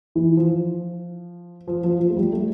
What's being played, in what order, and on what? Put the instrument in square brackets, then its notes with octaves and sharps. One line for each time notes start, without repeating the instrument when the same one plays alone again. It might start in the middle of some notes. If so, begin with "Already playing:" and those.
[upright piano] E3
F3
F3
F3
F3
A3
G3
A3